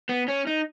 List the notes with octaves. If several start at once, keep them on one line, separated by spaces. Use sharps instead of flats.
B3
C#4
D#4